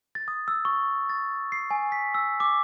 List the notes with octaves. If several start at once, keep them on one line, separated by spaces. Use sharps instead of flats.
A6
D#6
E6
C#6
A6
C7
G#5
B6
E6
D6